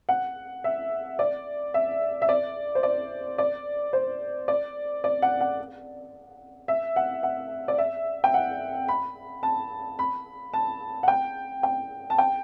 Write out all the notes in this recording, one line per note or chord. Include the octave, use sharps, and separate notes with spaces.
F#5
E5
D5
E5
E5
D5
C5
D5
D5
C5
D5
D5
F#5
F#5
E5
F#5
F#5
D5
E5
G5
F#5
B5
A5
B5
A5
F#5
G5
G5
A5
G5